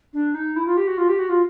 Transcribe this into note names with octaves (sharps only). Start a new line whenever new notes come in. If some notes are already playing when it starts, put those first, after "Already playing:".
D4
D#4
E4
F4
G4
F#4
F4
G4
F#4
F4